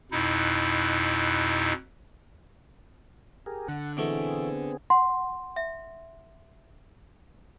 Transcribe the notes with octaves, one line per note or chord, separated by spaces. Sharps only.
F2 B2 D#4 E4
G4 G#4 A#4
D3 F#5
B2 E3 A3 B3 C4 G#4
F#5 C6
E5